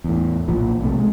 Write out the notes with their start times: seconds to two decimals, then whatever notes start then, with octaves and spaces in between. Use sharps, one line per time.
0.04 E2 A2
0.48 B1 A#2 F3
0.81 B1 C3 A3
0.98 G#3